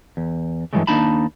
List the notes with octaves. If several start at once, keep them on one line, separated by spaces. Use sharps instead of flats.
E2
G2 A#2 E3 F#3 G#3 A3
D#2 A#3 D4 D#4 A5 B5